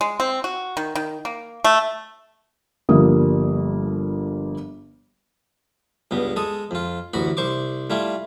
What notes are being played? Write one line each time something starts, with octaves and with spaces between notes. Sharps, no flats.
G#3
C4
F#4
D#3
D#3
A#3
A3
G1 F3 G3 A#3 D#6
C#2 G2 B3
G#3 A4 D#6
F2 F4
A1 D2 F#4 B5
C2 C5 C#6 D6
G3 A3 E4 F4